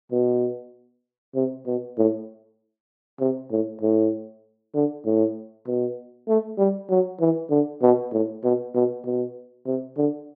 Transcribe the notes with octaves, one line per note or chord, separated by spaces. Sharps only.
B2
C3
B2
A2
C3
A2
A2
D3
A2
B2
A3
G3
F#3
E3
D3
B2
A2
B2
B2
B2
C3
D3